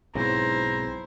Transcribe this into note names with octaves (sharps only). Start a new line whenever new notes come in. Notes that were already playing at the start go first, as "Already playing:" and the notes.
B1 G#2 C4 E4 C5 A#5